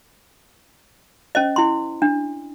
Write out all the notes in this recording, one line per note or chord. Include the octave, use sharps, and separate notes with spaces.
C#4 C5 D#5
E4 C6
D4